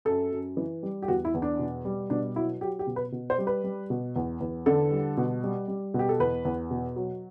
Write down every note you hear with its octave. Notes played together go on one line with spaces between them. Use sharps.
F#2 A4
F#2
E3
G3
G4
E2 F#4
E4
E2
D4
B2
G3
B2 D4
F#3 E4
F#3 G4
G4
B2
B4
B2
C5
G3
B4
G3
B2
E2
E2
D3 A4
G3
B2
G3
G3
B2
G4
A4
E2 B4
E2
B2
F#3